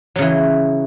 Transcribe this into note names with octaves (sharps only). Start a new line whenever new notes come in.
C#3 E3 F#3